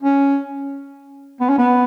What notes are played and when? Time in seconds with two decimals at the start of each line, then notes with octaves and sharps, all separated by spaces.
0.02 C#4
1.40 B3
1.49 C#4
1.58 B3